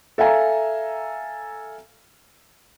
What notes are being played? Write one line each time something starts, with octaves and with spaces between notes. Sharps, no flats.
A4 E5 F5 G#5 A#5